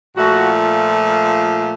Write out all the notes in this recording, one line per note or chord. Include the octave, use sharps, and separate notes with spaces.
A#2 F3 A3 F#4